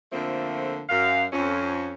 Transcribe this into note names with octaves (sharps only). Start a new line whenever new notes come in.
F2 D3 F3 A3 A#3 C4
F#2 F5
F2 C#4